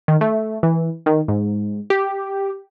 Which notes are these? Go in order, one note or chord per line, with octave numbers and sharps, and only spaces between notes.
D#3
A3
E3
D#3
G#2
G4